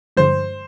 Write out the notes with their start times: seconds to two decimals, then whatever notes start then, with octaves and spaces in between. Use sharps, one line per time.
0.17 G2 D3 F3 G#3 C5